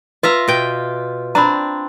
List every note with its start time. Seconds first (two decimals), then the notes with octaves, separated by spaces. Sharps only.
0.23 F4 B4 E5 A#5
0.48 B2 G5
1.35 C4 D4 A#5 B5